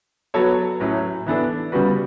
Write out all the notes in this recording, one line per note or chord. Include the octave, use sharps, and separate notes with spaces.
F#3 B3 F#4 A4 C#5
A2 F#3 A3 C#4 E4
E3 B3 D4 A4
C#3 G3 B3 F#4 B4